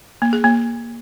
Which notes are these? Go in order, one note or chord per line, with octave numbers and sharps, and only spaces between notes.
A#3
G#4
A#3